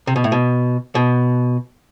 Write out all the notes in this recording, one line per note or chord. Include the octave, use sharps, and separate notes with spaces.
C3
B2
A2
B2
B2